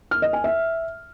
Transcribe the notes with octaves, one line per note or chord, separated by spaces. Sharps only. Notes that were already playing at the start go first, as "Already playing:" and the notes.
F6
D#5
G#5
E5